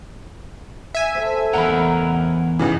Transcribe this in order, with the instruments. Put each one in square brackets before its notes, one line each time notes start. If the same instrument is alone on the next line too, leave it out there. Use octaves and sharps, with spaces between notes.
[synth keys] E5 G#5
[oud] A3 C4
[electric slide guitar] E2 A#2 A#4 [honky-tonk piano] F#5 B5
[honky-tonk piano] A1 C#3 E3